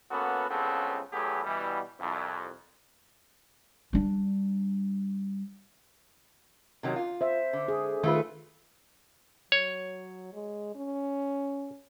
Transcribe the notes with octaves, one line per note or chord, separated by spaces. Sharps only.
A#3 B3 C#4 F#4 A4 B4
C#2 G2 C#3 B3 C4 A4
E2 F#3 A3 B3 G4 G#4
B2 E3 G3
C2 F2
G3 D4
C3 D#3 F#3
F4
C5 E5
D3
G#4
D#3 A3 F4 B4
F#3 C#5
G#3
C#4